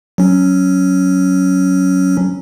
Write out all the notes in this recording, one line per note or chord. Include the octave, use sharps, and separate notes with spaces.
F#3 C#4